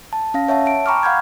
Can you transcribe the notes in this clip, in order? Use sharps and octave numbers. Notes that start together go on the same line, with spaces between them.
A5
C#4 F5 A#6
C#5 E5 F#5 A5
A5 D7
G5 A#5 B5 C#6 D6 F6
F5 F#5 B5 F6 G6 G#6